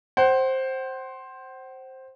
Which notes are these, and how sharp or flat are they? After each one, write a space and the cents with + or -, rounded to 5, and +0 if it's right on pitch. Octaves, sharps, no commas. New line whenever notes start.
C5 +10 F#5 +40